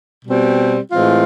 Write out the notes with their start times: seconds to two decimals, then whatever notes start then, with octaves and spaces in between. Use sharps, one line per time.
0.25 B2 G3 C4
0.91 A2 E3 G#3 C4 F4